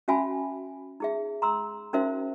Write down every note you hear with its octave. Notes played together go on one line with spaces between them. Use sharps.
C#4 F#4 E5 G#5 A5 B5
D#4 G#4 E5
A#5 C6 E6
C#4 D#4 F#4 A#4 C5 E5